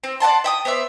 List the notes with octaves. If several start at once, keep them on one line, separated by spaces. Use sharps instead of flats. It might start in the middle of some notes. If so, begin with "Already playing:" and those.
C4
D5 F#5 A5 C6
E5 G5 D#6
B3 C5 D5 E5